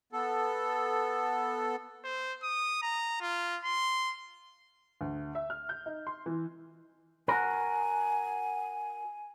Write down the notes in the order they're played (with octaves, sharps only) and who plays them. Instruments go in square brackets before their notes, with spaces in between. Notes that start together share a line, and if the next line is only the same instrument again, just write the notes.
[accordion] B3 A4
[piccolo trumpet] C5
D#6
A#5
F4
C6
[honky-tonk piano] D2
E5
F6
G6
D#4
C6
E3
[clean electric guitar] F#4 A#4 [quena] G#5